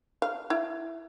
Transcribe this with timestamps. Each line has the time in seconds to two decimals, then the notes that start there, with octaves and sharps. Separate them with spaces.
0.22 F5
0.50 E4